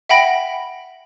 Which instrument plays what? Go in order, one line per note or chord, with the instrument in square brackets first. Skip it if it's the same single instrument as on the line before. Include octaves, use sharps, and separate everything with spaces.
[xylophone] E5 F#5 G5 B5 A#6 D7